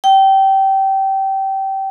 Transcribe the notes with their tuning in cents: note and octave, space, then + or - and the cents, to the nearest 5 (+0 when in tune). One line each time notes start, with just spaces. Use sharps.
G5 -20